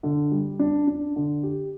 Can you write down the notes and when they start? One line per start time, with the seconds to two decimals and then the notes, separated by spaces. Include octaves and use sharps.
0.03 D3
0.31 G3
0.59 D4
0.87 D4
1.16 D3
1.43 G4